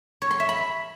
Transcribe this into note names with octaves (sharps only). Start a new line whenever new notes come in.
C#5
C6
E5
B5